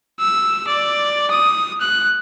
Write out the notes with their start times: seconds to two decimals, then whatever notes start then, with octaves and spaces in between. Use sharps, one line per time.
0.20 E6
0.68 D5
1.31 D#6
1.81 F#6